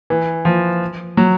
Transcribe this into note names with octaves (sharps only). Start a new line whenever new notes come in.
E3
F3
F#3